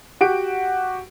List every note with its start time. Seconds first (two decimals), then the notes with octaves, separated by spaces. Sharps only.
0.21 F#4 G4 D7